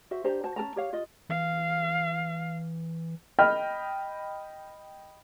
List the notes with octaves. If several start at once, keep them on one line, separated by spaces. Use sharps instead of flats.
F#4 C5 E5
D4 G4 C5 A#5
F#4 C5 A5
C#4 A#4 A5 A#5
G4 C#5 F5
F4 D#5
E3 F5
D#5 G5 B5 F6